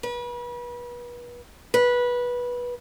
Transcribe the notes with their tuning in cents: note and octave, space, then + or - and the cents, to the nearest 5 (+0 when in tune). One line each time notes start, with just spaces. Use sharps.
B4 -35
B4 -15